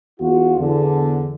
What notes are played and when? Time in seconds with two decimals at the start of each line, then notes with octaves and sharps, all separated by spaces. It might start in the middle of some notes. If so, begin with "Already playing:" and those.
0.20 E2 F4 F#4
0.58 E2 D3